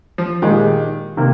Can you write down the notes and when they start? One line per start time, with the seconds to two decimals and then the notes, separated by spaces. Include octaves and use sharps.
0.18 F3
0.42 A#2 D#3 G#3 D#4 G4
1.17 C3 D#3 A#3